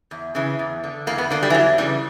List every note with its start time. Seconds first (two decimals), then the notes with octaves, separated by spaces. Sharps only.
0.11 E2
0.35 C#3 E3
0.59 E2
0.84 D3
1.07 E2 A#3
1.18 B3
1.30 D3 A#3
1.43 G3
1.50 E3
1.54 E2 F#3
1.78 C#3 E3 G3